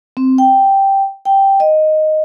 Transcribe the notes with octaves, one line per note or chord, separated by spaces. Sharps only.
C4
G5
G5
D#5